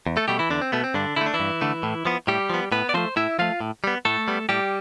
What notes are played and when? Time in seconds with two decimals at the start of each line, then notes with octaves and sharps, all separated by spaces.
0.06 E2
0.17 A3 A4
0.28 B2 G3 A3 G4
0.39 E3 E4
0.49 E2 D3 D4
0.61 C4
0.72 B2 A3 B3
0.84 C4
0.94 G2 D3 D4
1.16 D3 A3 E4
1.26 D4
1.34 E3 E4
1.40 G2
1.61 D3 A3
1.83 A2
2.05 F3 B3
2.27 A2 G3 G4
2.50 F3 B3
2.72 A2 B3 B4
2.89 D5
2.94 F3 A3 C4 C5
3.16 A2 E4 E5
3.39 F3 A3 F4 F5
3.60 A2
3.84 G3 B3
4.05 A2 A3 A4
4.28 G3 B3
4.49 A2 G3 G4